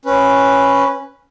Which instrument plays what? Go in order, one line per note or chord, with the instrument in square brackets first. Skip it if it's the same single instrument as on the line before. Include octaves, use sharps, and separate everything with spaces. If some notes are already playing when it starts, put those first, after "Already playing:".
[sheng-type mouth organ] C#4 B4